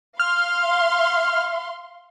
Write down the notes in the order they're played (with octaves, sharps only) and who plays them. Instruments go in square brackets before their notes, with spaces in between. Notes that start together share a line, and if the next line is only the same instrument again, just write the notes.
[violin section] F5 C6 [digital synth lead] F6